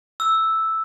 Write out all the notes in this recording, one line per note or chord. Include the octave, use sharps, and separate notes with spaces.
E6